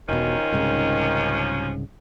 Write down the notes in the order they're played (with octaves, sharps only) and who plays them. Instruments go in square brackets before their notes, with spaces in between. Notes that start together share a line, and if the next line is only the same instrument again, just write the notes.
[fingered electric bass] E1 B2 [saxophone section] D#2 F3 C#4 [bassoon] D#3
[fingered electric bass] C2 G#2 C#3